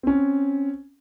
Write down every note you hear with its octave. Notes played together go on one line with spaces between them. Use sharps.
C4 C#4